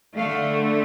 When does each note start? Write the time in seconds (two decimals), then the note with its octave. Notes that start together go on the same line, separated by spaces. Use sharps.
0.17 D3 A3 F5